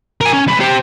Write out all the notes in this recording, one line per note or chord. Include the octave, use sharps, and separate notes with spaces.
A#4 G#5
C#4
C2 B4
G4 C5